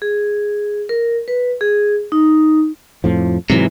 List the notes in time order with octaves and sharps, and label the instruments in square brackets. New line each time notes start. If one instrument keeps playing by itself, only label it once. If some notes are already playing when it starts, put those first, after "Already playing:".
[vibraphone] G#4
A#4
B4
G#4
D#4
[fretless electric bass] F2 A2 F3
[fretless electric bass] G#2 E3 [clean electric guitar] C3 F#3